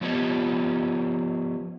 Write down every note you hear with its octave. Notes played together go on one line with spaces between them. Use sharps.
F3 B3 C#4 F4 G4 D#5